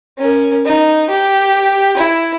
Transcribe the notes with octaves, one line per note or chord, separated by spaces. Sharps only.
C#4 A#4
D#4
G4
E4